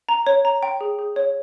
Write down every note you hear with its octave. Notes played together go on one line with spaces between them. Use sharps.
A#5
C#5
A#5
G5
G#4
G#4
C#5